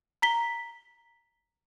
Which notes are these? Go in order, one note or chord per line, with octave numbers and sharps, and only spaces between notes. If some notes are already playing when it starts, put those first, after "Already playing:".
A#5 B6 G7